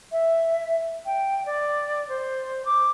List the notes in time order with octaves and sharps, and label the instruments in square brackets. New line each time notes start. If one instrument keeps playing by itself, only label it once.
[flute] E5
G5
D5
C5
D6